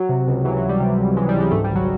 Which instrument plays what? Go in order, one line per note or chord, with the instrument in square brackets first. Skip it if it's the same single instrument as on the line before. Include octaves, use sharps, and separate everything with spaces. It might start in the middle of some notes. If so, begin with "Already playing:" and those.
Already playing: [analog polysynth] F#3
C3
C#2
E3 F#3
F#3
C#2
G3
C3
C#2
E3 G#3
G3
C#2
G#3
G#2 A3
G3
G#1
F#3